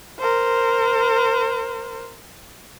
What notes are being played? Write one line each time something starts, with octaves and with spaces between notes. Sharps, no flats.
A#4 C5